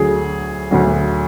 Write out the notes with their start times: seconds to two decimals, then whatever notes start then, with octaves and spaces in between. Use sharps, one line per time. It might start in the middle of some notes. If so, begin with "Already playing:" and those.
Already playing: D2 D3 F#3 G#4
0.71 D2 D3 F#3